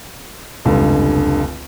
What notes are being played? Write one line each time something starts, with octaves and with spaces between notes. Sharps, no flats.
F1 C#2 G2 D3